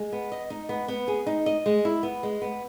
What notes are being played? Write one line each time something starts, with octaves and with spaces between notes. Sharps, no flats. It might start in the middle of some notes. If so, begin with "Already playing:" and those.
Already playing: G#3
B3
D#5
D#4
B3
B3
G#4
D#4
D#5
G#3
E4
B3
G#3
B3